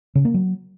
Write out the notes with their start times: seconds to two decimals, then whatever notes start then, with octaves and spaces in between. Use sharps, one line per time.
0.15 C#3
0.25 A#3
0.34 F#3